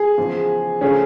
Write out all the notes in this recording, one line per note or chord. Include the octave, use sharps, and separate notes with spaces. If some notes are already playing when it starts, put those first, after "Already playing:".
Already playing: G#4
E2 C#3 F3
C#3 F3 A3 C#4 G#4